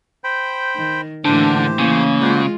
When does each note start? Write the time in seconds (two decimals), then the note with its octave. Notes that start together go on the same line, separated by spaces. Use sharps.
0.24 C5 G5 B5
0.76 D#3
1.25 A2 D3 E3 A#3 D4 G4 C5
1.79 C#3 E3 A#3
2.21 G#3 F4 F#4 C5 D5